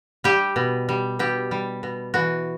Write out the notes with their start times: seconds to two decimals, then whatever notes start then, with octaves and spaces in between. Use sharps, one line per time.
0.24 G3 G4
0.56 B2
0.89 G3
1.19 B2 G4
1.51 G3
1.83 B2
2.14 E3 F#4